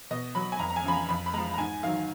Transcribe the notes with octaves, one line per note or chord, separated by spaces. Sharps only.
B2 D#5
F#3 B5
G#5
F2 A#5
A#5
G#5
C#3 F3 B5
A#5
F2 B5
B5
F3 G#3 A#5
A#5
G#2 G#5
D#3 F#3 F5